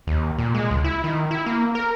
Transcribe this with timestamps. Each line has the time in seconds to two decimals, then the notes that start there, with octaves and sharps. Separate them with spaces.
0.07 D#2
0.38 A#2
0.55 G#3
0.71 C#2
0.84 E4
1.04 D#3
1.31 E4
1.46 A#3
1.75 A#4